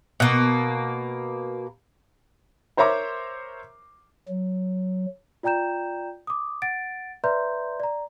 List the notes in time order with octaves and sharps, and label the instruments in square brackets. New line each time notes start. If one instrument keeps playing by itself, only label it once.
[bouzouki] B2 A#3
[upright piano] A#4 C5 C#5 E5 A#5 D6
[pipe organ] F#3
[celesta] F4 D5 G5 A#5 G6 E7
D6 D#6
F#5 A6 D7
B4 D5 E5 A#5 C6 G6
D5 A#5